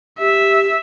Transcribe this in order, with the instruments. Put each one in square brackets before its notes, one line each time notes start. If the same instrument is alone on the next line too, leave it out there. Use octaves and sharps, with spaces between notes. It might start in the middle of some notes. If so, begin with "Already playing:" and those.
[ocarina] G4 [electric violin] E5